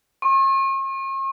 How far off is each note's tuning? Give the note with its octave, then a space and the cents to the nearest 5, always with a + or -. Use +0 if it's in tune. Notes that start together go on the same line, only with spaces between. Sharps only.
C#6 -45